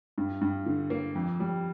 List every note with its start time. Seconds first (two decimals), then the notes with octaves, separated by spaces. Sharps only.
0.18 G2
0.41 G2
0.66 D3
0.90 A#3
1.15 F2
1.40 G3